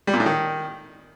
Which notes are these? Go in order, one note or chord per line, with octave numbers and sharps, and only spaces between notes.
G3
A#2
A2
D#3